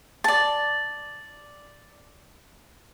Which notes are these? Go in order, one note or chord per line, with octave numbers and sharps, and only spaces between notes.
D5 A5